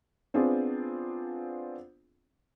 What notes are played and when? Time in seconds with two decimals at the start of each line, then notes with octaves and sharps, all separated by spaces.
0.34 B3 C4 D4 F4 G#4